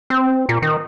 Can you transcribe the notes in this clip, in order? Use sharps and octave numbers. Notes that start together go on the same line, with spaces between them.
C4
A#2
D#3